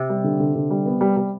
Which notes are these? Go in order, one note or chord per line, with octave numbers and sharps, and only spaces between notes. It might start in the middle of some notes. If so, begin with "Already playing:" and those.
Already playing: C3
G3
D3
D3
D3
G3
B3
G3
G3